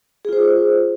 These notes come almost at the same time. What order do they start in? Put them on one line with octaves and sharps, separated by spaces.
G#4 F4 C5